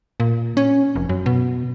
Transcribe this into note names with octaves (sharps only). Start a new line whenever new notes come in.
A#2
C#4
F1
F#2
B2